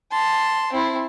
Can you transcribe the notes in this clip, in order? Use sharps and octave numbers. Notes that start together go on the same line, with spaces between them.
A5 C6
C4 E4